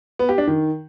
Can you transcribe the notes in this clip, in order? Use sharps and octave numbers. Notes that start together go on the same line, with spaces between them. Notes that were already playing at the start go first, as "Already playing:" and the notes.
B3
G4
D4
D#3